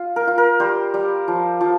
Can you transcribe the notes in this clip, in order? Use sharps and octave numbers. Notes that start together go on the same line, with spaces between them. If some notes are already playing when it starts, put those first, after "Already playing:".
Already playing: F4
A#4
F4
A#4
G3 C5
G3
F3
F3